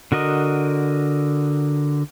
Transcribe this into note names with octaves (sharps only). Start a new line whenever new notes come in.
D3 F#4 A#4 D#5